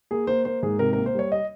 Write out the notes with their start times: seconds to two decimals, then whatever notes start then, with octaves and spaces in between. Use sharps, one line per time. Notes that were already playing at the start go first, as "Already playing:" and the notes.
0.11 A#3 G#4
0.27 A#3 C5
0.45 A#3 C5
0.63 G#2 G#4
0.79 C3 A#4
0.93 A#3 A#4
1.06 C5
1.15 G3 C#5
1.32 D#5